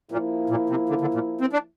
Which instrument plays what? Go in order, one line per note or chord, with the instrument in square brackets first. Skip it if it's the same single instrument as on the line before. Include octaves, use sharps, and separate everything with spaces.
[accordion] A#2 [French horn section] F3 A#3 E4
[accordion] A#2
C3
D3
D3
A#2
C4
D4